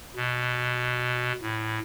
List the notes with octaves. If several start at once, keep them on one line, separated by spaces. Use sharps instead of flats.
B2
A2